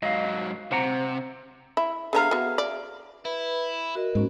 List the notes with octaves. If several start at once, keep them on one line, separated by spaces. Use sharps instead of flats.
G#2 F#3 D#5 F5
C3 C5 F#5 A#5
E4
D3 B3 G#4 E5 F5 A#5
B3 F#4
D5
E4 B4 B5
F#4 A#4 D#5
G#2 A#3 C#4 F#4